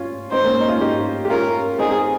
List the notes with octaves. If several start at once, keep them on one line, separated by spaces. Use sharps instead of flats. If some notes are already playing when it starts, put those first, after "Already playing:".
Already playing: C#4 F4
C4 D#4 C5
A#3 C#4
D#4
C#4 F4
D#4 G4
G4
C#4 F4 A#4
C4 D#4 G#4